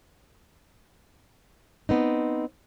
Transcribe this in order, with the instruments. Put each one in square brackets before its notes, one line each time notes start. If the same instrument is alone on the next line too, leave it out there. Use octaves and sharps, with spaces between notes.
[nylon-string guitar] B3 C4 D#4